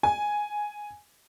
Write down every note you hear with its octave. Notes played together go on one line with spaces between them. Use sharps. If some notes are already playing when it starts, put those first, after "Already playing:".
G#5